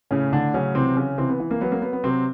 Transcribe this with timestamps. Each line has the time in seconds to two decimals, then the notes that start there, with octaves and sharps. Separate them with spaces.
0.11 A2 C#3 C#4
0.32 A2 D3 D4
0.54 C#3 F#3 C#4
0.75 C3 E3 C4
0.96 C#3 C#4
1.18 C3 E3 C4
1.29 B3
1.40 E3
1.51 A#3
1.61 F#3 B3
1.72 A#3
1.82 F#3 B3
1.93 B3
2.04 C3 F#3 C4